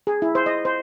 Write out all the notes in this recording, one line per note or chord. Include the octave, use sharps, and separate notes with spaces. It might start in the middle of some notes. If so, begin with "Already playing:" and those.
G#4
E4
C5
D#5
C5